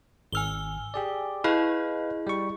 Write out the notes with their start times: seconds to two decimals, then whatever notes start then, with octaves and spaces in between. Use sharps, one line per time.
0.33 G#1 G#5 E6 F6 G7
0.94 G4 G#4 D5
1.44 E4 G#4 B4 D#5 F5
2.27 G3 C#6